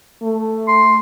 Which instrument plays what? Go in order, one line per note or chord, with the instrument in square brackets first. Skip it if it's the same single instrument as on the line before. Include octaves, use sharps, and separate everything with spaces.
[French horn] A3
[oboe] C6